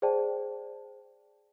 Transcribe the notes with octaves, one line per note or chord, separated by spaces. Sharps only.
G#4 C5 D5 G5 A5